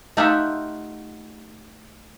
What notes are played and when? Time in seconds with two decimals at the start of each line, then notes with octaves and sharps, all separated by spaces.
0.17 A3 D#4 F4 G4 E5 F#5